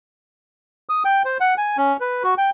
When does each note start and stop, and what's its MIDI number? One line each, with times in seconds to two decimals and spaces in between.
0.89 1.03 87
1.05 1.23 79
1.25 1.38 72
1.40 1.54 78
1.58 1.77 80
1.77 1.97 61
2.00 2.23 71
2.23 2.34 66
2.38 2.50 79